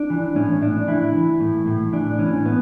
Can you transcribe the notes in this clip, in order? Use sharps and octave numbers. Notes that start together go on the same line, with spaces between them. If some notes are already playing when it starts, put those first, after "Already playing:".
Already playing: D4
E3
A2 C#4
A2 D4
E3 E4
E3
A2
A2
E3 D4
E3 C#4
A2 B3